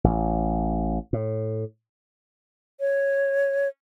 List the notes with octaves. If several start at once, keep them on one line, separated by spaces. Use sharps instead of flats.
A1
A2
C#5